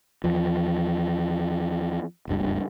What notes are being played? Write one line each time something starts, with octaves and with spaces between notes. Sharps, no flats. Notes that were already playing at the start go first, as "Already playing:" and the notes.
E2 F3
F#1 C#2 G2